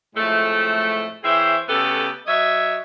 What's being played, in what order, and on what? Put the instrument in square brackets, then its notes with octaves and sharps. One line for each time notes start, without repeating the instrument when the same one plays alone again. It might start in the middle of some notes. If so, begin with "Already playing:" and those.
[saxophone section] F2 A2 G#3 A3
E3 C4 G#4 C5 C#5 E5
C#3 A3 B3 G4 A4
F#3 C#5 D#5 E5